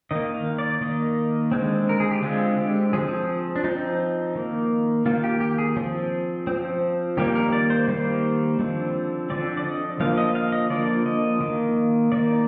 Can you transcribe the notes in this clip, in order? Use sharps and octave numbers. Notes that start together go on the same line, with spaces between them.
D#3 A#3 D#5
F5
D5
D#3 A#3 D#5
D3 G#3 C4
A#4
G#4
G4
D3 G#3 C4 F4
G4
F3 C4 G#4
D4
F3 C4 D#4
D#3 A#3
D#3 A#3 F4
G4
G4
G#4
F3 C4
F3 C4
D#3 G3 A#3 G4
A#4
D5
C5
D#3 G3 A#3 C5
D3 F3 C4
D3 F3 C4 D5
D5
D#5
D3 F3 A#3 F5
D#5
F5
D#5
D3 F3 A#3 D5
D#5
D#3 A#3
D#3 A#3 D5